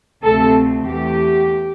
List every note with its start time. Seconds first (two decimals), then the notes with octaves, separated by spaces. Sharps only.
0.23 D2 C3 F3 A3 C4 A4
0.84 E2 E3 A3 G4